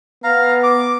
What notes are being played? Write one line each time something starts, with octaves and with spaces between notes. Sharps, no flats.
B3 F5 A#5
D6